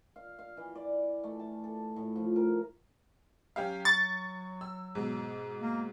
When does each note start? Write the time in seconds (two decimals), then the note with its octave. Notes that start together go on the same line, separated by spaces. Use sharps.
0.16 F5
0.39 F5
0.57 E3
0.75 D5
1.24 A3
1.39 A5
1.64 A4
1.96 A2
2.16 F3
2.36 A#4
3.56 F#3 C#4 G4 F5
3.85 C#6 A6
4.61 E6
4.95 G#2 B2
5.62 A#3